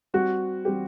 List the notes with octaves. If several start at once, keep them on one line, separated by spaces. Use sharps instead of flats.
G3 C4 F#4 G4
G3 C4 G4